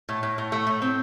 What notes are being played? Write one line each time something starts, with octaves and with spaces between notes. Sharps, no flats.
A2
A2
A2
A3
A2
C4